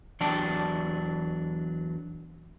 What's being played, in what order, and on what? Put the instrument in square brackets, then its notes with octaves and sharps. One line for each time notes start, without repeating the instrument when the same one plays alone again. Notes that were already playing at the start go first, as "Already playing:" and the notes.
[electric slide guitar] E2 F#3 D4 G5 A5